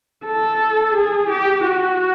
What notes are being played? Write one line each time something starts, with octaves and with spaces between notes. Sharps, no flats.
A4
G#4
G4
F#4